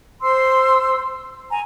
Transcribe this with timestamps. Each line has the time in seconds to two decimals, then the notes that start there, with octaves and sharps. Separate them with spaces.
0.21 C5 C6 E6
1.50 G#5 A#5